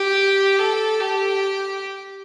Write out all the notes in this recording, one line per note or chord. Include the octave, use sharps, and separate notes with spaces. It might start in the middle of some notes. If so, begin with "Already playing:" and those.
Already playing: G4
A4
G4